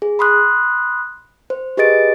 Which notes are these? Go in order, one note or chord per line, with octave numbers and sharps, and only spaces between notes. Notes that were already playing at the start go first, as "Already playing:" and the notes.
G#4
B5 C6 D#6 F#6
C5
G4 G#4 B4 D#5 A6 D7